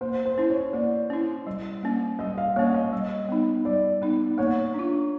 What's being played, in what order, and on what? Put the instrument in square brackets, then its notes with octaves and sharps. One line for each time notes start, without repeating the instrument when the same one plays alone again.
[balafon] A#3 [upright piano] C5
[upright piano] C5
[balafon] C#4 E4
[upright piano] C#5
[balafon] A#3 [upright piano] D5
[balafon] C#4 E4
G3
A#3 C#4
[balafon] G3 [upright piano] D#5
[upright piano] F5
[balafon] A#3 C#4 [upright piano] C#5
[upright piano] D#5
[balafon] G3
B3 D#4
[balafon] G3 [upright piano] D5
[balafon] B3 D#4
[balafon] A#3 [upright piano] C#5
[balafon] D4 F4